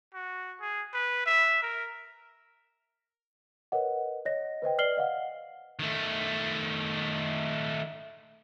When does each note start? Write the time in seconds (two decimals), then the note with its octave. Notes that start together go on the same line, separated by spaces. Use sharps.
0.14 F#4
0.60 G#4
0.94 B4
1.26 E5
1.63 A#4
3.72 A#4 B4 C#5 D#5 F#5
4.25 C#5 D#5 A#6
4.62 B4 C5 D#5 G5
4.78 B4 D5 F6 C7 F#7 G7
4.97 D#5 F5 F#5
5.79 D#3 A3